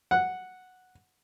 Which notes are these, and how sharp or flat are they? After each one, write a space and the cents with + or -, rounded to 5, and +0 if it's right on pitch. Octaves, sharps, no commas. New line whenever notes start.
F#5 -5